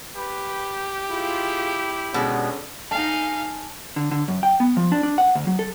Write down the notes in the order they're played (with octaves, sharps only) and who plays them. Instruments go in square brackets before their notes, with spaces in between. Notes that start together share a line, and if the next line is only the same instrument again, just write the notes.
[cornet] G4 [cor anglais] B4
[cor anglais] E4 [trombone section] F4 G#4
[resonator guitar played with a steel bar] B2 G#3 [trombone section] D3 C#4
[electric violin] D#4 F5 [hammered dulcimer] G#5 A5
[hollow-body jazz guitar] D3
D3
F#2
G5
B3
F3
D4
D4
F#5
D2
F#3
A4